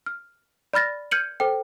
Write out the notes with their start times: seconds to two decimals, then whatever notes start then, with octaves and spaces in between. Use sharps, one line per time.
0.06 F6
0.73 D5 B5 F6 A6 A#6
1.11 F6 G6 G#6 C#7 D#7 F#7
1.40 A4 C5 G5